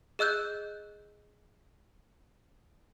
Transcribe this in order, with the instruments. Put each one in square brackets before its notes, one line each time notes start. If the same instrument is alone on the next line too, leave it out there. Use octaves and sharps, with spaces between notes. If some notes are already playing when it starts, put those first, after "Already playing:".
[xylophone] G#4 D#5 E6 F#6 G6